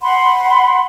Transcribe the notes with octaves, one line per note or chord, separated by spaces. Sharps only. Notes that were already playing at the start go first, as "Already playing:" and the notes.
F#5 B5 C6